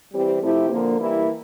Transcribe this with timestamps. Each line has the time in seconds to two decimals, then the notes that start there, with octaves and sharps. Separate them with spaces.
0.11 E3 G3 C4 G4
0.40 C3 F3 A3 E4 G4
0.69 D3 F3 A#3
0.99 E3 G3 A#3 E4